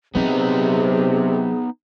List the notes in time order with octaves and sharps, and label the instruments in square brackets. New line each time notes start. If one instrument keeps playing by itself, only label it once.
[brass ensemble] C3 [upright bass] F#3 C4 [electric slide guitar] B3 D#4 [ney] G#4